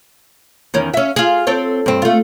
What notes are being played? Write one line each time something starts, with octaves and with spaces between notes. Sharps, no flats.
E2 D#3 C#4
C#4 E5
F4 G#4
C4 A4 C#5
G2 C4
A3 F4